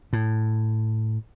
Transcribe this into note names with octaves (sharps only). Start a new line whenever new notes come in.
A2